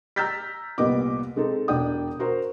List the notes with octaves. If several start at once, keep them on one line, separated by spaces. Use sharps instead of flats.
A#5 E6 F6 G6 A6 B6
C2 A#2 B3 G4 D#5 D6
G#3 C4 D#4 A4
E1 D4 D5 G5 D#6
F#4 A#4 C5 A#5